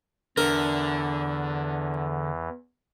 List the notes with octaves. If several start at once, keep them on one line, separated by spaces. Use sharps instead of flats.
E2 D3 E3 A#4